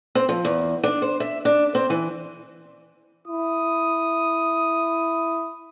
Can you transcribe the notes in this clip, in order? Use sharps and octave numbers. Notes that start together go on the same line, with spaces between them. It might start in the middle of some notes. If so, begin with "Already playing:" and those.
C4
F3
E2
D4
C5
E5
D4
C4
E3
E4 D#6